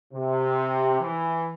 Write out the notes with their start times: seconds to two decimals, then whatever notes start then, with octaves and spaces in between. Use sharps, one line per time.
0.13 C3
1.01 E3